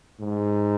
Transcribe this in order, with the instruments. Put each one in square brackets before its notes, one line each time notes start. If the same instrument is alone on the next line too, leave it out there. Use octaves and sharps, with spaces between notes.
[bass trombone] G#2